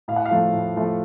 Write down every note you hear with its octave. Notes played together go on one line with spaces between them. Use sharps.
A2 F5
F#5
F5
F3 A3
A2
F3 A3